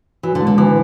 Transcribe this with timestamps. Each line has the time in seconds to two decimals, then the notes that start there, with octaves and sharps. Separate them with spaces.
0.23 E3 F#4
0.35 D3
0.41 G#3
0.47 D3
0.58 D3 E3